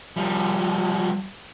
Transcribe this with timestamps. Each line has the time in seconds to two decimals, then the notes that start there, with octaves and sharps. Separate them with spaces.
0.16 F3 G3